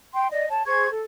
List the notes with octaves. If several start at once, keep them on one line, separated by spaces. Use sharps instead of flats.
G5 C6
D5 D#5
C#5 A5
G#4 C5 C#6 G#6
A4